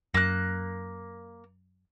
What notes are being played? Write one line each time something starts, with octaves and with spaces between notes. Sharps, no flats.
F#2 A#3 F#6